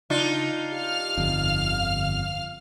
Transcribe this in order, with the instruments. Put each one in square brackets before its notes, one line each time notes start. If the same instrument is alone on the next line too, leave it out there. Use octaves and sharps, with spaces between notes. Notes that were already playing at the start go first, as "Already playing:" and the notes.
[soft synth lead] C#3 [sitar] D4 D#4 F4
[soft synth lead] G4 [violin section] F5 F6
[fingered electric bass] G1 F2 [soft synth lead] D3